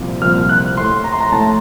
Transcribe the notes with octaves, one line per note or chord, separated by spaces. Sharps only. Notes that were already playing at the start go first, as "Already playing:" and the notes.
Already playing: C2 A#2 F3
C2 A#2 F3 F6
F#6
A2 A3 C6
A#5
C6
A#5
A2 A3 A5